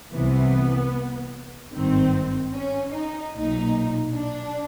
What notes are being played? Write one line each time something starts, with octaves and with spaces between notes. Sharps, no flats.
C2 C3 E3 B3
G#1 G2 D#3 C4
C#4
D#4
B1 A#2 D#4
D4